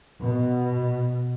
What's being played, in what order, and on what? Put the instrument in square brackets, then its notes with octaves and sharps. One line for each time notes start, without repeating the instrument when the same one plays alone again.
[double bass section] B2